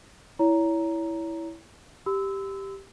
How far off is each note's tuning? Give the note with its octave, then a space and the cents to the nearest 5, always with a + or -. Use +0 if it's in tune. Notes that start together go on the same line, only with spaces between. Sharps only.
E4 +0 C#5 +30 A#5 +0
G4 +0 C6 -45 E6 -15